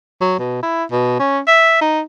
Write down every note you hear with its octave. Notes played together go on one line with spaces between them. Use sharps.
F#3
B2
E4
B2
C#4
E5
D#4